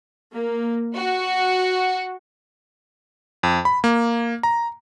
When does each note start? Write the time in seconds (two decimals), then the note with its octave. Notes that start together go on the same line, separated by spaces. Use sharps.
0.32 A#3
0.95 F#4
3.43 F2
3.65 B5
3.84 A#3
4.43 A#5